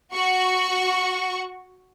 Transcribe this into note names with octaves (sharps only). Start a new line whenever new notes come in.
F#4 C#6